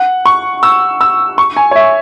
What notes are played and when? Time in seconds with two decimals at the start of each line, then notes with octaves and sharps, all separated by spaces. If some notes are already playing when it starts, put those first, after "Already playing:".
Already playing: F#5
0.26 C#6
0.63 E6
1.01 E6
1.38 C#6
1.57 G#5
1.71 C#5
1.75 E5